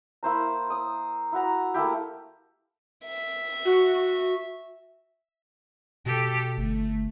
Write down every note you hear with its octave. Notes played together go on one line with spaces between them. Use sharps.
A#3 E4 C5 A#5
D#6
E4 F#4 A#5
A3 A#3 E4 G4
E5
F#4
B2 G4 A4
G1 A3